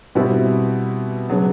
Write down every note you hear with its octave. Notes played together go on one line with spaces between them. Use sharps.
B2 G3 C4 E4
C#3 F#3 B3 D4